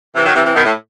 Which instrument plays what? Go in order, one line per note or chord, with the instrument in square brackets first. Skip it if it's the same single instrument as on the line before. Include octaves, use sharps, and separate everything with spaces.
[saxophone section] C3 E3
D#3 F#3
C3 E3
C3 E3
B2 D#3
A2